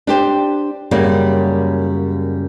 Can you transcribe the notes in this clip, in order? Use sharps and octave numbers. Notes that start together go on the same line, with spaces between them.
D4 G4 C5
F#2 C#3 G3 A#3